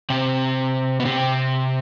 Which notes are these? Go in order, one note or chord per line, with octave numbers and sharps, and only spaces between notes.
C3 C4
B3
C3 C4